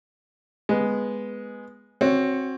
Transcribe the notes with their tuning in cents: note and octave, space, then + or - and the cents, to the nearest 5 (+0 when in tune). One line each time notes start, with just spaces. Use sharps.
G#3 +0 B3 -5
C4 +20 F#4 +0 C#5 +10